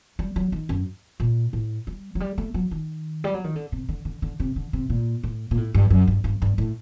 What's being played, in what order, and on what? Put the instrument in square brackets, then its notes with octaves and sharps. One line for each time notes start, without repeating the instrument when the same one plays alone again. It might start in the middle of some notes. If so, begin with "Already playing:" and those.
[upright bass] G3
F#3
D#3
F#2
A#2
A2
G3
F#3
G3
A3
F#3
D#3
G3
F#3
D#3
D3
C3
D3
D3
D3
C3
D3
C3
A#2
A2
A#2
A2
G2
F#2
G2
G2
G2
A2